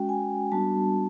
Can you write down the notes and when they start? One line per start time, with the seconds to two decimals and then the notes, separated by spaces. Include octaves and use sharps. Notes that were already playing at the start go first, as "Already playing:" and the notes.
Already playing: G#3 C#4 F#4 G5
0.09 G#5
0.52 G3 B3 D4 F#4 A5